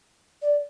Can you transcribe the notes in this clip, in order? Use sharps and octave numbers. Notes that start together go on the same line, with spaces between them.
D5